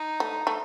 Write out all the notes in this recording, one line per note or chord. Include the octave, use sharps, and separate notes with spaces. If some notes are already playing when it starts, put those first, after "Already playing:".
Already playing: D#4
A3
A3